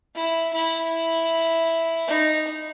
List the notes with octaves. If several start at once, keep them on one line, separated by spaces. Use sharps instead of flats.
E4
E4
D#4